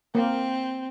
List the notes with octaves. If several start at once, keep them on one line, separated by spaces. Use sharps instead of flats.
A#3 C4